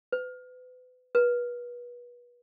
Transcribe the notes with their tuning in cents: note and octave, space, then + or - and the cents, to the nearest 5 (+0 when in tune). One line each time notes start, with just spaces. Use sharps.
B4 +35
B4 -30